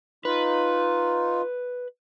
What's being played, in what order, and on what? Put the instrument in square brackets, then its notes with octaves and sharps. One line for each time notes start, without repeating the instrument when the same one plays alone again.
[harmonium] D#4 F4 [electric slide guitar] B4